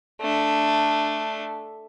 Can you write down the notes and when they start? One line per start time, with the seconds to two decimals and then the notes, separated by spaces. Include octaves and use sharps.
0.21 A3 D4